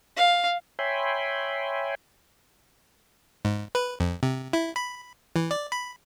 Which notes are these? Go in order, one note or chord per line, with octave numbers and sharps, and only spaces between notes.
F5
C#5 E5 G5 G#5 B5 C6
G#2
B4
F2
C3
E4
B5
E3
D5
B5